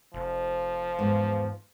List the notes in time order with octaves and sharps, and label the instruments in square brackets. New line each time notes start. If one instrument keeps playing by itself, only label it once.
[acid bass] F1 [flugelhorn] F3
[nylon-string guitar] E2 G#2